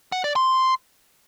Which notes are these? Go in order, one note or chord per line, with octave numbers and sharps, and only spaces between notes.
F#5
D5
C6